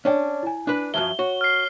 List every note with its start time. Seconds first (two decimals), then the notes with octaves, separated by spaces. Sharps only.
0.05 C#4 D4 C#5 D5 G5
0.43 E4 G#5
0.67 D4 B4
0.94 F#2 F3 F#3 E5 G7
1.19 F#4 C#5 C#6
1.41 F6 C7